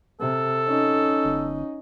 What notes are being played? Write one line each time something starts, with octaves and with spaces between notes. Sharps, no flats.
C3 A4
C#4 D#4
G1